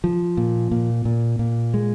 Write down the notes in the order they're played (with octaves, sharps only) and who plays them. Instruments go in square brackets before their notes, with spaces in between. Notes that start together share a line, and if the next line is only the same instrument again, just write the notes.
[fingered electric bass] F3
A#2
A#2
A#2
A#2
G#3